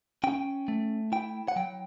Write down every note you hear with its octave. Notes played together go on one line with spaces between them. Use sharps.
C#4 G5
A3
E4 G5
F#5
F#3 G5